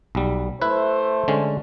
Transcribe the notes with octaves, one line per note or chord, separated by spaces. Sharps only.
B1 G3
A3 E4 B4 C5
D3 G#3 C#4